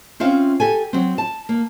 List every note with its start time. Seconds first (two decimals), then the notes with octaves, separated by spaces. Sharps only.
0.20 C4 C#4 F4 E5 F5
0.60 G4 A4 G#5
0.93 F#3 C4
1.18 A5
1.49 A#3